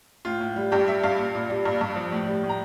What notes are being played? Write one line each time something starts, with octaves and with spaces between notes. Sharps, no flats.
A2 F4
A2
G3
G2 G4
G3 E5
G2 F5
A#2
A#2
G3
G2
G2
F3
A2
G3
A2
A#5